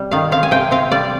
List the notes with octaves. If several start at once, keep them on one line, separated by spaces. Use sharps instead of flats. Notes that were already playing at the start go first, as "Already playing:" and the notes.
Already playing: C3 G3
D#3 F5
C4 F5
G#5
C3 G5
C4 F5
G3 D5